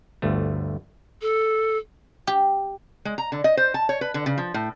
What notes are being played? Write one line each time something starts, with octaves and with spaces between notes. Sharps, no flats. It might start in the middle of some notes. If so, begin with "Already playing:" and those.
G1 D2 A3
A4
G4
G#3
A#5
D3
D#5
C5
A5
C#5
B4
D3
C#3
F3
A2